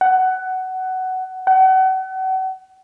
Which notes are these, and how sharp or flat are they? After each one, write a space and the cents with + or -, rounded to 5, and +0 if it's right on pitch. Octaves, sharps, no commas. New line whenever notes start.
F#5 +15
F#5 +35